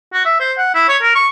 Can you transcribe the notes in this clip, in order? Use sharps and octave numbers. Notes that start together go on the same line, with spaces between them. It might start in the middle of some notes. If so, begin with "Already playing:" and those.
F#4
E5
C5
F#5
E4
C#5
A#4
C#6